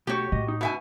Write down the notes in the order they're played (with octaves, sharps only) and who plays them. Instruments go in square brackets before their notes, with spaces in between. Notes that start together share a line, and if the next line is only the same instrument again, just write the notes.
[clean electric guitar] B1 A3 C#5 [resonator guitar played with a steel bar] F#4 G4
[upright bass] A2 [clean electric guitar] D#5
[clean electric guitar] D#4
[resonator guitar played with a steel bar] B2 E5 G#5